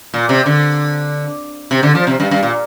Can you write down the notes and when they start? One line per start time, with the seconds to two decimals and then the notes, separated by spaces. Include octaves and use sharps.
0.14 A#2
0.29 C3
0.46 D3
1.71 C3
1.83 D3
1.95 F3
2.07 C3
2.20 G2
2.31 G2
2.43 A#2